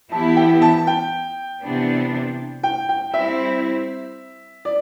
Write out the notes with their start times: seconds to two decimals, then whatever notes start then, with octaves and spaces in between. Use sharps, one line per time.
0.12 E3 B3 E4 G4 A5
0.36 G5
0.62 A5
0.87 G5
1.63 C3 E3 B3 D4
2.63 G5
2.89 G5
3.14 G3 C4 E4 E5
4.65 D5